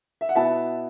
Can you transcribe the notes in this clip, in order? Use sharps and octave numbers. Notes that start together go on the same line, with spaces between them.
E5
F#5
B2 B3 E4 E5 A5